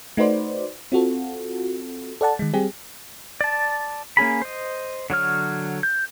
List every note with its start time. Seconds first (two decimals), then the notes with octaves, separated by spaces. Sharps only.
0.17 A3 D#4 F#4 B4 C5 D5
0.92 C4 F4 F#4 A4
2.21 A4 D5 F#5 A5
2.39 D#3 G#3
2.54 G3 C4 G4 G#4
3.41 D5 A5
4.17 A#3 C#4 G#4 B5
4.42 C5 D#5
5.10 D3 F#3 C#5 F6
5.83 G6